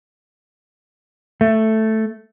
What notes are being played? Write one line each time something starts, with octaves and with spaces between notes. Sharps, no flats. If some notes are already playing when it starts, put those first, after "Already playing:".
A3